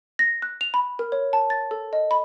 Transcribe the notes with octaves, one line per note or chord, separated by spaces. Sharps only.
A#6
F#6
F7
B5
A#4
C#5
A5
A6
A4
D#5
B5